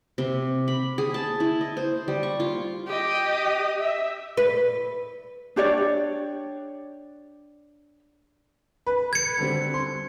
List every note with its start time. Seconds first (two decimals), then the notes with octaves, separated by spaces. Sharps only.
0.18 C3
0.68 B5
0.98 G#4
1.14 A5
1.40 E4
1.61 D#5
1.77 C5
2.08 G3
2.23 C#6
2.40 F4
2.87 G4 D#5
3.79 E5
4.37 B4
5.56 D4 G4 C#5 D5
8.87 B4
9.13 G#6 C#7
9.38 D3 G3 C4
9.74 C6